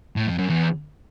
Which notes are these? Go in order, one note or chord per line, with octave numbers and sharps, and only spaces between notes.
A2
F2
F#2
E2